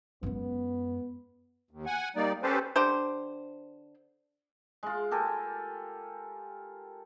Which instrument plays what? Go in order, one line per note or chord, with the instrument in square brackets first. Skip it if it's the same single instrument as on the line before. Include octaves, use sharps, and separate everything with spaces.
[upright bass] F#2 G#3 [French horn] B3
[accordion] D#2
F#5 G#5
G3 A#3 D#4 D5
C4 C#4 G4 A4 B4 C5
[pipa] D3 D4 G4 C5
[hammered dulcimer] G#3 F4
G4 A4 A#4 G#5